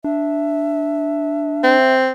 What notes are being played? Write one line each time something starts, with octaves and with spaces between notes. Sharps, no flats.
D4 E5
C4